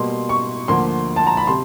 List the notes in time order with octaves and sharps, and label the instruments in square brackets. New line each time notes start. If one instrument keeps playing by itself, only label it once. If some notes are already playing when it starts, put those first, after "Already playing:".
Already playing: [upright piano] B2 G3 A#3 C6
C#6
D2 D3 F3 A#3 C6
A5
A#5
B5
C3 C6